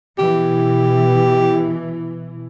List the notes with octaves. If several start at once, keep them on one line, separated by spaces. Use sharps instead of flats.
B2 E3 G4